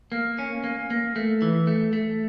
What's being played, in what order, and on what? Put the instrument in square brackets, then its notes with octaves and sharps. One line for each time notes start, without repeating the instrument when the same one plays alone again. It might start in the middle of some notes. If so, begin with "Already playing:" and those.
[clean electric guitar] A#3
C#4
A#3
A#3
A3
E3
A3
A3